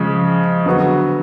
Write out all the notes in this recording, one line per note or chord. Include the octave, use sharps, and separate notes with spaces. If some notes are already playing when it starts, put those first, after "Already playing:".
Already playing: C#3 F3 G#3
D3 F#3 B3 F#4